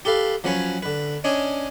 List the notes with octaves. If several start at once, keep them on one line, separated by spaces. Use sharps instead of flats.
G4 A4 B4 F5
F3 F#3 C#4 B4 C#5
D3 B4
C#4 D4 C#5 D#5